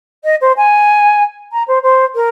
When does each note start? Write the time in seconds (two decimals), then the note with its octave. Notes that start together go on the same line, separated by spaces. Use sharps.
0.24 D#5
0.41 C5
0.56 G#5
1.52 A#5
1.67 C5
1.83 C5
2.15 A#4